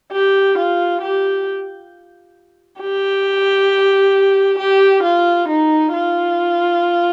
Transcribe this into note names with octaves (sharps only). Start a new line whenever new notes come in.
G4
F4
G4
G4
G4
F4
D#4
F4